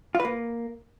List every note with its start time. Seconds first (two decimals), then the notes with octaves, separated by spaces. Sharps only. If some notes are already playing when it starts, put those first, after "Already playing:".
0.15 F4
0.20 B4
0.25 A#3